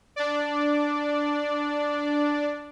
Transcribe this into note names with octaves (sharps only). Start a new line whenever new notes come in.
D4 D5